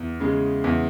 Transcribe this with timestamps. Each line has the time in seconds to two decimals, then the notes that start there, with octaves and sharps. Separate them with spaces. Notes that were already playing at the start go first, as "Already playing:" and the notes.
Already playing: E2
0.20 C#3 G#3
0.64 E2